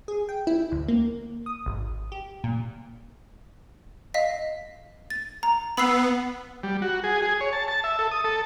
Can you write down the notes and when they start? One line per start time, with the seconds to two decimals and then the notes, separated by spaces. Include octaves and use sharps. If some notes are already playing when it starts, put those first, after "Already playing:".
0.08 G#4
0.29 G5
0.47 E4
0.72 D2
0.88 A#3
1.46 D#6
1.66 G#1
2.12 G4
2.44 A#2
4.14 D#5 F5 B6
5.10 A6
5.43 A#5
5.77 B3 B5 E6 C7
6.63 G3
6.82 F#4
7.04 G#4
7.22 G#4
7.41 C#5
7.53 A5
7.68 A5
7.84 E5
7.99 A4
8.11 D#6
8.24 A4